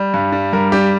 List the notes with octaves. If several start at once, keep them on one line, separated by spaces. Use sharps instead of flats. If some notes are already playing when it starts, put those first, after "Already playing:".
Already playing: G3
G2
G3
G2 A#4
G3 G4